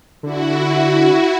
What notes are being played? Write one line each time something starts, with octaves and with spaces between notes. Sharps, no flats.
D3 E4 F#4